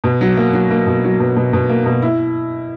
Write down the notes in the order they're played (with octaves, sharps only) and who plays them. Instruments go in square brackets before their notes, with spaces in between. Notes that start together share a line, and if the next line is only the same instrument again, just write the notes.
[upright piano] B2
F#3
A#3
F#3
A#3
B2
F#3
B2
B2
B2
A#3
B2
E4